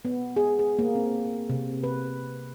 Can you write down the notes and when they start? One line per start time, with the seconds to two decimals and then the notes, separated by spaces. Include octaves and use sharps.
0.05 B3
0.37 G#4
0.59 G#4
0.79 A#3
0.95 C4
1.49 C3
1.84 B4